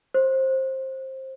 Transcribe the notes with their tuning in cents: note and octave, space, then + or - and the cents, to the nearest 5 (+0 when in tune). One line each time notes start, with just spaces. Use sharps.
C5 +20